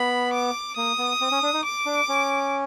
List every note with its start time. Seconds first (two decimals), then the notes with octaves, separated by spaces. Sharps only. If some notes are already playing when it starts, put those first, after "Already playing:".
Already playing: B3 B5
0.33 D6
0.77 A#3 D#6
0.98 B3
1.21 C4
1.32 C#4
1.43 D4
1.54 D#4
1.65 D6
1.86 D4
2.09 C#4